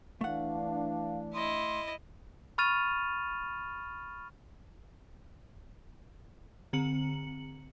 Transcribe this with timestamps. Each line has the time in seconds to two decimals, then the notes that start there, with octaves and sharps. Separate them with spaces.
0.21 E3 A3 D4 F5 F#5
1.34 E4 D#5 C6
2.58 B5 C#6 F6 A6 D#7 F7
6.73 D3 C4 A#5 C#7 F#7